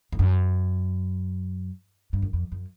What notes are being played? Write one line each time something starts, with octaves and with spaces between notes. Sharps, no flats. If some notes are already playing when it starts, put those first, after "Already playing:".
F2
F#2
G2
F#2
F2
F#2